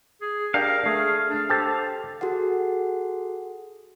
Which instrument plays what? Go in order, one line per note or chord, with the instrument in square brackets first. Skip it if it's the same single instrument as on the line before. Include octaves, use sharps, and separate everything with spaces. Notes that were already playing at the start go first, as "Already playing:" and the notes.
[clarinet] G#4
[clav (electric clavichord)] D4 G4 [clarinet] A#4 [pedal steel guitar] F5
[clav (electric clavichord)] A3 [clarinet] G#4
[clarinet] D4
[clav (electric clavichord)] G4 A4 A5 [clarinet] C5
[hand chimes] F#4 G#4 A4 F#5